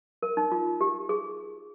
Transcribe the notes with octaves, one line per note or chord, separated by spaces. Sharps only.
A#4
D#4
F4
G4
G#4